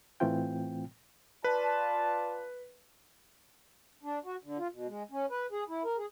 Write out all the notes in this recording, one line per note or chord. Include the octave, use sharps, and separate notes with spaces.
A2 E3 A3 C4 F4 G5
F4 B4 D5 A5
D4
F#4
D3
F4
B2
G#3
C#4
B4
G#4
E4
A#4
G#4